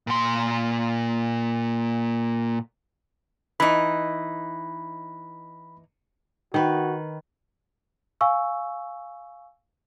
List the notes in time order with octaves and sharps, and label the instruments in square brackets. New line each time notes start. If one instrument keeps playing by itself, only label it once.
[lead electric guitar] A#2 C6
[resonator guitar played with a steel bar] E3 D#4 [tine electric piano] B5
[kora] D#3 B4 [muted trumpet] F#4
[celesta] F5 G#5 C#6 E6